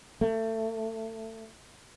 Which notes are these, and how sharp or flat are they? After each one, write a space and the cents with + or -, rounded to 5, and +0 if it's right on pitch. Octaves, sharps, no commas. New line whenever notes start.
A3 +25